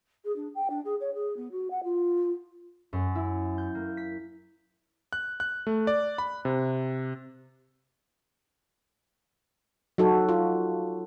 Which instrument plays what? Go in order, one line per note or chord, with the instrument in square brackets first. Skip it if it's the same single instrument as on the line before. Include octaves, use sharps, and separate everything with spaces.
[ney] G#4
D4
G5
D4
G#4
C#5
G#4
B3
F#4
F#5
F4
[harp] F#2
E4
G6
A#3
B6
[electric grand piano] F#6
F#6
A3
D5
B5
C3
[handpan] F#3 D#4 F#4 A4
F4